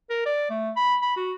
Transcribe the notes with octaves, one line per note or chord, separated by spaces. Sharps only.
A#4
D5
A3
B5
B5
F#4